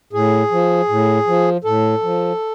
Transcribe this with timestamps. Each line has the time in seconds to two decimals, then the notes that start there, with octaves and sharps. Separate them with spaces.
0.13 A2 G#4
0.51 F3
0.89 A2
1.27 F3
1.64 A2 A4
2.02 F3